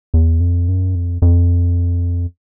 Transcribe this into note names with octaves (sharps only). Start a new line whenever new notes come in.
E2
F2
F#2
F2
F2